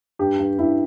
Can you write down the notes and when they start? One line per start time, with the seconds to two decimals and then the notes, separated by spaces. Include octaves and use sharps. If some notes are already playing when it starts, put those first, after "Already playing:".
0.19 G2 G4
0.39 G2
0.58 G2 E4